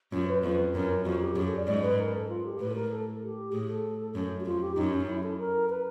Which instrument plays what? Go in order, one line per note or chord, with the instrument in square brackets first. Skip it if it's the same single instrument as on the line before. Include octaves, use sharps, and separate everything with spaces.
[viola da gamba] F#2 [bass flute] F4
[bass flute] C5
B4
[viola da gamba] F2 [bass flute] B4
[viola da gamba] F#2 [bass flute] A#4
[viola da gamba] F2 [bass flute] F#4
[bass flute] G4
[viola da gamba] F#2 [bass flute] G#4
[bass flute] A4
D5
[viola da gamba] G#2 [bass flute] D5
[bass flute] B4
A#4
A4
F4
G4
[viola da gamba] A2 [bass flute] B4
[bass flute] A4
A#4
A4
G4
[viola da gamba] A2 [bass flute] G#4
[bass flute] A4
[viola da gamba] F#2
[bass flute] F#4
[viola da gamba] F2 [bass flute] F4
[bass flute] G4
[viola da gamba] F#2 [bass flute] D#4
[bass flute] C#4
E4
A4
A#4
B4